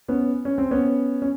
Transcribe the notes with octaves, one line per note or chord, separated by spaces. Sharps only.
B3 C#4
C#4
C4
B3 C#4
C#4